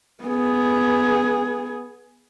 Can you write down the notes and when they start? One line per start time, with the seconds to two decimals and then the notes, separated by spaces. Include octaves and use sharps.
0.23 B3 G#4